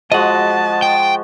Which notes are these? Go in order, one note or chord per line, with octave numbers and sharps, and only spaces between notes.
F3 G#3 F#4 D#5 F#5 A5
G5